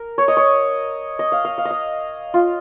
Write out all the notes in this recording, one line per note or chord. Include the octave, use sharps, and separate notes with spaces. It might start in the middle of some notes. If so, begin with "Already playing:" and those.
Already playing: A#4
C#5
D#5
C#5
D#5
F5
F5
F5
D#5
F5
F4